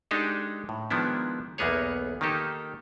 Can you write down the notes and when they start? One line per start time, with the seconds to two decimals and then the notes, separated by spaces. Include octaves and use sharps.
0.11 G#3 D4 D#4 G4 A4
0.69 A2
0.90 D#3 F3 G#3 B3 D4 E4
1.58 B1 E2 A#3 B3 G#4 C#5
2.21 D#3 A#3 D#4 G4 A4